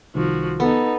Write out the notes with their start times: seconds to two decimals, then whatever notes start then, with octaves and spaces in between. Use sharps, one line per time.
0.15 C2 D#3 F3 F#4
0.60 B3 D#4 A4